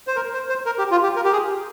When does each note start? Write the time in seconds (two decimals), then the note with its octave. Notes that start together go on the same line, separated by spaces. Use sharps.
0.07 C5
0.16 A#4
0.34 C5
0.49 C5
0.66 A#4
0.78 G4
0.91 F4
1.03 G4
1.16 A#4
1.24 G4
1.33 G#4